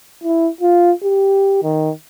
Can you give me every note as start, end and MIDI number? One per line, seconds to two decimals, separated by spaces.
0.24 0.49 64
0.61 0.92 65
1.03 1.61 67
1.64 1.91 51